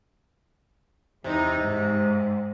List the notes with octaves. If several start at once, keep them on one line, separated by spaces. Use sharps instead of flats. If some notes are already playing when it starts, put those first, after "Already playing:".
E2 C3 D#4
G#2